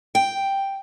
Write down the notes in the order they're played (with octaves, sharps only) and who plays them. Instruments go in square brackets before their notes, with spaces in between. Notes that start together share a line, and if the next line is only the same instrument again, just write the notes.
[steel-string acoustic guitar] G5